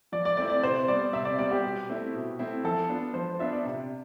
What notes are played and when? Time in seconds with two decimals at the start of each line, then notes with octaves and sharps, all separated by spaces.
0.12 F3 D5
0.25 D5
0.37 A3 C4 E4 D5
0.50 D5
0.63 C3 C5
0.88 G3 B3 D5
1.13 C3 E5
1.25 D5
1.38 G3 B3 D5
1.51 G4
1.63 B2
1.89 A3 C4 E4
2.14 B2
2.39 A3 C4 E4
2.64 F3 A4
2.89 B3 D4 F4
3.14 F3 C5
3.39 B3 D4 F4 E5
3.52 D5
3.65 C3